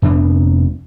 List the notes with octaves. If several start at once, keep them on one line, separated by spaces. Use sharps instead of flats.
F1 F2 B3 D4